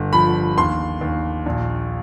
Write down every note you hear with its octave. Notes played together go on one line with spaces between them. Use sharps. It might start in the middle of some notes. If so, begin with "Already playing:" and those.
Already playing: G1
F3 B5
D#2 C6
D#2
A#1